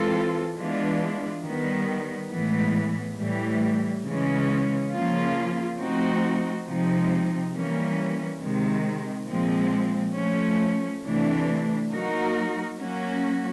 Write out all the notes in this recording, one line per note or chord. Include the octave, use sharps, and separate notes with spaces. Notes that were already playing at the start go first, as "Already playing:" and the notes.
Already playing: E3 G#3 C4 F4 A4
E3 G#3 B3 D4 F4
D#3 G3 B3
A2 E3 G#3 B3
A2 E3 G3
C#3 E3 G#3 C#4
C#3 F3 A#3 C#4 F4
F3 A3 C4 D#4 F#4
C3 F3 G#3 C4 D#4
E3 G3 A#3 C#4
C3 D#3 G#3
A#2 F3 G#3 C4
F3 A3 C#4
C3 E3 A3 D4
F#3 A#3 D#4 F#4 A#4
F#3 A#3 C#4 F#4